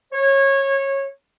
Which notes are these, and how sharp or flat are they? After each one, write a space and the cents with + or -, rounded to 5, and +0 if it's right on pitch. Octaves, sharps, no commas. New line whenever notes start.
C#5 -20